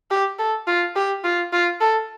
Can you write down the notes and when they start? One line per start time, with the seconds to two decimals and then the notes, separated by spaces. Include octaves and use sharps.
0.10 G4
0.38 A4
0.67 F4
0.96 G4
1.24 F4
1.53 F4
1.81 A4